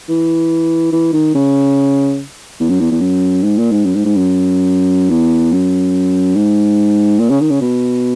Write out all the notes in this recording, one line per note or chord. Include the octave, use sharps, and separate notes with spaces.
E3
E3
D#3
C#3
E2
F#2
E2
E2
F#2
G#2
A#2
G#2
F#2
G#2
G#2
F#2
E2
F#2
G#2
A#2
C#3
D#3
C#3
B2